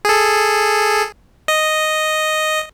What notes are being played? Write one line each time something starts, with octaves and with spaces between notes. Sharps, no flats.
G#4 A4
D#5